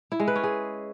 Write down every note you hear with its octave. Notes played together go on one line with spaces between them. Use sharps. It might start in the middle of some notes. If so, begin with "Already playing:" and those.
E4
G#3
B4
C#4
G#4